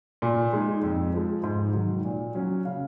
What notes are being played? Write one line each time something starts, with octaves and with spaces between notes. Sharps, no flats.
A#2
G#3 D#4
F2
F3 G#3
G#2
D#3 F#3
A#2
F#3 C#4
C#3 F5